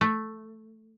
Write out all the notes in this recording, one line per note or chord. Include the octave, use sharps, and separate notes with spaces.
A3